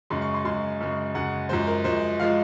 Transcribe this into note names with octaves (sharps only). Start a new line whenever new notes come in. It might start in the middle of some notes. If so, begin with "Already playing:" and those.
F#2 C#3 G#3 C6
C#6
C6
F#2 C#3 G#3 C6
F#2 C#3 G#3
F#2 C#3 G#3 F#5
F#2 F3 G#3 C5
A#4
F#2 F3 G#3 C5
F3 G#3 F5